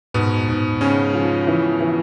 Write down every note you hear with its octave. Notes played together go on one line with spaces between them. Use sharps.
G#2 B2 B3
G#2
C#3 G#3 C#4
F3
E3
E3